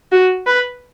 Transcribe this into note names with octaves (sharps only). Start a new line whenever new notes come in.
F#4
B4